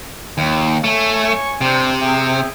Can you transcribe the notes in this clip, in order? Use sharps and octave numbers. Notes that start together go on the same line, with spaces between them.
D#2
A3 C#5 G#5 C#6
C3 G3 D4 C5
G#4 E5 G5